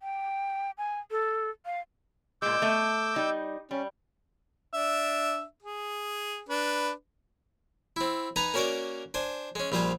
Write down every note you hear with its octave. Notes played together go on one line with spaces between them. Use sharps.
G5
G#5
A4
F5
A#2 G#3 D6 E6 G6
A3 E5
G3 D#4
G3 C#4
D4 E5
G#4
D4 B4
C4 E4
D#4 B4 G#5 A#5
A#3 C#4 F#4 A#4 D5
D4 C5 G#5
G#3 C#4
A#1 G3 F4 C5 G#5